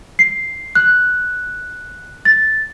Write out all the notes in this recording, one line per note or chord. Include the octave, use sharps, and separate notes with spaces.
C7
F#6
A6